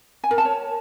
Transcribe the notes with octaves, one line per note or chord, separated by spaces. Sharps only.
G#5
A#4
A5
C#5